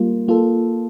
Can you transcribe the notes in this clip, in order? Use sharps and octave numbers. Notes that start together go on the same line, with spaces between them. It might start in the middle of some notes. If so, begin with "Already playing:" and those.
Already playing: G3 A#3 F4
A#3 F4 A4